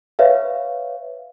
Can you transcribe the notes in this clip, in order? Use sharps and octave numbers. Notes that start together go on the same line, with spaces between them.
B4 C#5 E5 F5